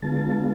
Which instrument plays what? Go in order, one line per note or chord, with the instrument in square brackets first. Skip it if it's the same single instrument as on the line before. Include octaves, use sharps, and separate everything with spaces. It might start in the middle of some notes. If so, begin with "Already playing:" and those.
[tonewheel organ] D3 G#3 B3 F4 A5